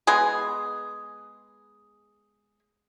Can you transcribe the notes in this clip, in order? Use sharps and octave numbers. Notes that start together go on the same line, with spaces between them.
G#3 B3 G#4